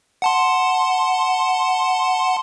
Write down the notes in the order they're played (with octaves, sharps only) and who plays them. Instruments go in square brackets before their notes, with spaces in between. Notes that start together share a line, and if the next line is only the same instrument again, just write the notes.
[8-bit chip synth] F#5 A5 C6